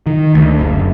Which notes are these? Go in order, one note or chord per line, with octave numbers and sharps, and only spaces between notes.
D#3
D2
F#1